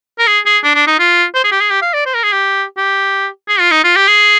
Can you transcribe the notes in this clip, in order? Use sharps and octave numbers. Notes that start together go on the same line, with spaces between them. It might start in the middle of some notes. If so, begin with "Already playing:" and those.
A#4
G#4
G#4
D4
D4
D#4
F4
C5
G#4
G4
G#4
G4
F5
D5
C5
A#4
G#4
G4
G4
G#4
F4
D#4
F4
G4
G#4